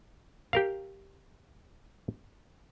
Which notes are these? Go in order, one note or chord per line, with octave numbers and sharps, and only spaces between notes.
G4 A#4 F5